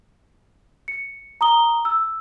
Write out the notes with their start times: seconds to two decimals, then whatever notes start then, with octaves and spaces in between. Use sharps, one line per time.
0.88 C#7
1.41 A#5 D#6 G7
1.85 E6